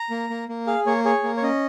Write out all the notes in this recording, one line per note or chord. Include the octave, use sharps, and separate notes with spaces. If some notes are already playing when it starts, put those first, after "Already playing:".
Already playing: A#5
A#3
A#3
A#3
G#4 F5
A#3 C#5
G#4 C#5
A#3
C#5
C#4 D#5